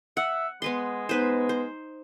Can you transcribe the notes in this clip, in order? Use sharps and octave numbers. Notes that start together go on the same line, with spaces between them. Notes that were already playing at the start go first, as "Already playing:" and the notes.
E5 F#5
G#3 B3 B4 C6
B3 D#4 B4 C5
C5